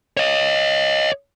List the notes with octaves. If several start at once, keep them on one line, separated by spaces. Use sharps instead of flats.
C#5 D#5